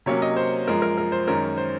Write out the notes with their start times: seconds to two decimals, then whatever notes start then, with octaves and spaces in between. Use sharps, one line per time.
0.06 C3 F#3 A#3 C#4 C#5
0.22 D#5
0.36 C5
0.67 F#2 F3 G#3 A#4
0.82 A#4
0.98 A#4
1.12 C5
1.27 F#2 D#3 G#3 C#4 A#4
1.58 C5